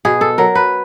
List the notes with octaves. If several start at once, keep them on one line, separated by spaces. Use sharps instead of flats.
B2 G#4
A4
F#3 A#4
B4